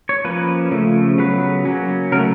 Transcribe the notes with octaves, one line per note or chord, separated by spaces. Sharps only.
C#5
F3 A#3 C#4 B4
C#3 F3 A3
C#3 F#3 B3 B4
F#3 A#3 C#4
C#3 F#3 A3 A#4